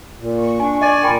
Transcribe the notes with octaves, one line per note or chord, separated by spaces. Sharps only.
A#2
C#6
D4 G#5
D5 D#5 G#5
A#2 A#4 G5 B5 C6